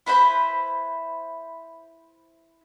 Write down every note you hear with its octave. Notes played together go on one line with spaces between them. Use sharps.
E4 B4 C5 B5